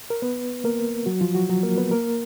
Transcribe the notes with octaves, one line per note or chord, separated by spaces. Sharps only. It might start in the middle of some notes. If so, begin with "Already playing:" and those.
A#4
B3 B4
A#3 A#4
F#3 F#4
F3 F4
F#3 F#4
F#3 F#4
A#3 A#4
B3 B4
A#3 A#4